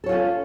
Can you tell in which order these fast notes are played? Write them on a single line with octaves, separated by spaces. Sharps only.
A4 C#5 F4 C#4